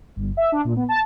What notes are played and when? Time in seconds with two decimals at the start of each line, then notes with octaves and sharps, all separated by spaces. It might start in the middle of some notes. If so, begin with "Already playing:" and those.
0.16 G1
0.37 E5
0.52 D4
0.65 A#2
0.76 B3
0.89 A5